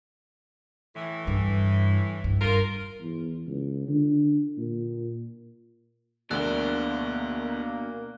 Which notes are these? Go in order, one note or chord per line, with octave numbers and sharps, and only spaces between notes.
A2 E3
G2
G2
F4 A#4
E2
C#2
D3
A#2
D2 B2 D3 A#3 D4 F#6 G7